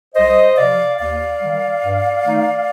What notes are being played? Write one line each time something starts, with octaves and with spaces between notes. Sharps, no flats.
C2 C5 D#5
C3 F3 D5 F5
D#2 D5 F5
D#3 G3
G2
D#3 A3 D#4